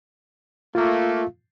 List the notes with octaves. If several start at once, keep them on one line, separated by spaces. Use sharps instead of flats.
A3 A#3 F4 F5